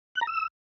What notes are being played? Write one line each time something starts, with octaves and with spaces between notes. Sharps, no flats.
F#6
A#5
E6